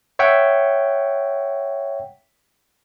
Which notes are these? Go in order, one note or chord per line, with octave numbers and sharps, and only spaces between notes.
C#5 E5 F#5 G5